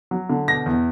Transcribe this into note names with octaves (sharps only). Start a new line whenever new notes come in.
F#3
D3
B2 A#6
E2